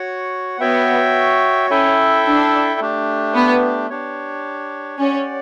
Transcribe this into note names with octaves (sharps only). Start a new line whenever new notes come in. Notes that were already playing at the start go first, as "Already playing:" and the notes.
Already playing: F#4 C#5 F#5
B3 F#4 C#5 E5 G5
C#4 E4 A4 E5 G5
D4
A3 D4 G4
B3
D4 G4 C#5
C#4 G4 D5 F#5